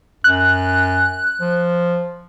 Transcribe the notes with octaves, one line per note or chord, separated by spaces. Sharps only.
F#2 F#6
F3